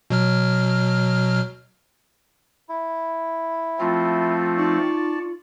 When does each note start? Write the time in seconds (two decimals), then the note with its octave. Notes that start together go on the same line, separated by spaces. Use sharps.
0.10 B2 F#3 F6
2.69 E4
3.79 F3 A3 C4 F4
4.58 D#4 D5 A5 C#6